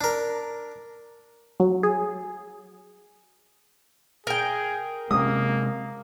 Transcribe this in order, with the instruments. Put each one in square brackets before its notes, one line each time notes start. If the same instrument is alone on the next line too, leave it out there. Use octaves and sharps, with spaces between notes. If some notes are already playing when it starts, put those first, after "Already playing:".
[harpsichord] D4 A#4
[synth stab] F#3
G#4
[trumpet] G#4 [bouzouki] A#4 G5
[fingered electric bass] C3 G#3 [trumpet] A#3 [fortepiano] D#6